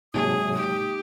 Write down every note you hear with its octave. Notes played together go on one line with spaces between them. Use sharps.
G#2 C3 F#3 G#3 A#3 D#4 G#4 D#6
G4